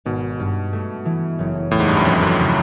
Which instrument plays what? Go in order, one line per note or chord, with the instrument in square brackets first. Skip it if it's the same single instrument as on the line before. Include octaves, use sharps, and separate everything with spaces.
[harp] G#1 [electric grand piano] B2
[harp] G2
A3
E3
F#1
[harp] E2 [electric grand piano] A2
[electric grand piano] G#2
G2
F#2
[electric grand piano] F2 [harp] F3
[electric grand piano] F#2
[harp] C#3